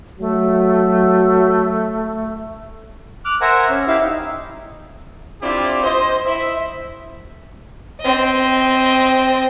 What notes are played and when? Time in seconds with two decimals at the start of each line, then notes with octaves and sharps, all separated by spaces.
0.19 F#3 A3
3.25 D6 F6 F#6
3.41 A#4 C5 E5 F#5 G#5 A#5
3.69 C#4
3.88 E4 G4 E5 F5
4.02 D#4
5.42 C4 D4 E4 F4 G4
5.83 C5 D#5
6.26 E4 C5 E5
8.01 C4 D#5